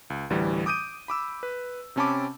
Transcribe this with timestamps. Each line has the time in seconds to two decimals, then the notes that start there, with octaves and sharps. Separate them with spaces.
0.10 C#2
0.30 A1 D2 E3 G3
0.66 D6 D#6 G6 D7 D#7
1.08 B5 D6 E6
1.43 B4
1.96 C3 C4 C#4 A5 B5 D6